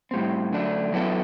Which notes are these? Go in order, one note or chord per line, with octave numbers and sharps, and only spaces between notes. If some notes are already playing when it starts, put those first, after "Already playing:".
A2 G3 C4
F#2 D3 A3 D4
F#2 F#3 B3 E4 A4